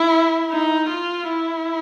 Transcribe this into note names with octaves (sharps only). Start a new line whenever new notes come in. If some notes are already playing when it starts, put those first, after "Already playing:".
Already playing: E4
D#4
F4
E4